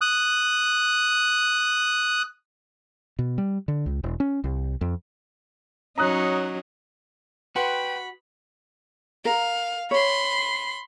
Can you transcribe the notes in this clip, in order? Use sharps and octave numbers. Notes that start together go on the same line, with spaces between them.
D#6 F#6
B2
G3
D3
C#2
E1
C#4
C2
F2
F#3 C#4 D#4 A#5 D#6 F#6
F#4 B4 F#5 G5 B5 C6
A#4 F5
C#5 B5 C6